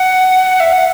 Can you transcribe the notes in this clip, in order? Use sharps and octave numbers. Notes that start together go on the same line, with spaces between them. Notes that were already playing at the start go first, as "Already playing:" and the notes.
Already playing: F#5
E5
F#5